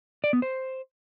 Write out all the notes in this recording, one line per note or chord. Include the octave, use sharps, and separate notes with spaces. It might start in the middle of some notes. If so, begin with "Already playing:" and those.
D5
B3
C5